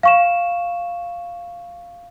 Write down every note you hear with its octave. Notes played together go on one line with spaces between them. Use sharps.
F5 C#6 E7